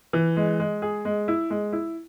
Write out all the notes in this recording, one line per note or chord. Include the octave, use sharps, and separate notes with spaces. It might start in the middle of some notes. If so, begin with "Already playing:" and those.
E3
G#3
G#3
G#4
G#3
E4
G#3
E4